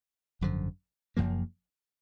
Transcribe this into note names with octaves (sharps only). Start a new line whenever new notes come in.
G#1 F#2 D3 F3
F#1 F#2 F3 A#3